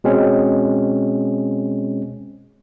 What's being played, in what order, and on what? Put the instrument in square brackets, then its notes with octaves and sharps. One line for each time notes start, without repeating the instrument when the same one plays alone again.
[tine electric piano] B2 G#3 C4 C#4